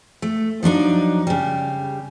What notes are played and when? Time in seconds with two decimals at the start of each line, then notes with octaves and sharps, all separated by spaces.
0.22 A3
0.63 F3 F#3 D4 D#4
1.27 C#3 G3